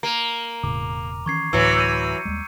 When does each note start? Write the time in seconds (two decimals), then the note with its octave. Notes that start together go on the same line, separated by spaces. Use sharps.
0.03 A#3 A#5 D#7 F7
0.63 E1 A2 C#3 D6
1.26 D#3 E3 C#4 C#6 G#6 C7
1.53 D2 A2 E3 F#3 D4 E6
1.78 G6 C#7 D#7
2.25 D#2 G3 G#3